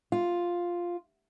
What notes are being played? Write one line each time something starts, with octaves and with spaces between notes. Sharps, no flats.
F4